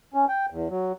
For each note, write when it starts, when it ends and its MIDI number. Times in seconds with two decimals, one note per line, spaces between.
0.14 0.25 61
0.29 0.46 79
0.50 0.68 40
0.70 0.92 54